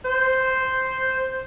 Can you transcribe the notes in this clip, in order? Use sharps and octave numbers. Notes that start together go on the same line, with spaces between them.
C5